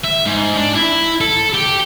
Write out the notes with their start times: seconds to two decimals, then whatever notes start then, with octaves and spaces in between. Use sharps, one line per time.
0.04 E5
0.26 G#2
0.56 D4
0.75 E4
1.21 A4
1.54 G4